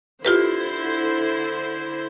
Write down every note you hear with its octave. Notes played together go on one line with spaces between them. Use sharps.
D3 E4 F4 G4 B4 C5